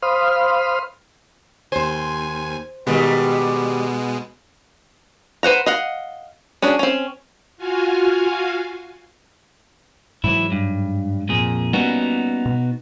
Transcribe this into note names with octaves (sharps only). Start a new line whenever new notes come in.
C5 F5 B5 C6 D#6 F6
D#2 C5 G#5
B2 D#3 G3 G#3 B3
B4 C5 F#5 A#5
D#5 F5 F#5
C#4 D4 F#4 G#4
C4 C#4
F4 F#4 F5 G#5
G#2 E3 F#3 G#3 E4
G2
F2 A#2 G#4
G3 A#3 B3 C#4 D#4 F#4
B2